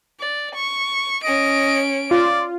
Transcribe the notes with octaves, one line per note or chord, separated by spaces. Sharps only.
D5
C#6
C#4 D#5 D7
F4 D5